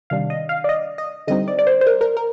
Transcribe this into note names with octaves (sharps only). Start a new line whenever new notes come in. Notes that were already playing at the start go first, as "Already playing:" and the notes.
C3 D#3 G3 D4 F5
D#5
F5
D5
D#5
D#5
D3 G3 C4 D#4 D#5
D5
D5
C5
C5
A#4
A#4
A#4